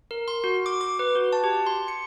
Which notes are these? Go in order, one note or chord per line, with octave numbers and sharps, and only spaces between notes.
A#4
C6
F#4
D6
D6
B4
F#4
A5
G4
C6
C#7